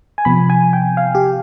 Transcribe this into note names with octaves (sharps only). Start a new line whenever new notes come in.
G#5
C3 F3 B3 B5
G#5
G5
F5
G4